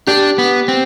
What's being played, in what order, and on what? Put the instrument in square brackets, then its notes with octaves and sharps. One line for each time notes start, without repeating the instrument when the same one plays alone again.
[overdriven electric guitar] D4 [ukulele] G4
[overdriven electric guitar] B3
C4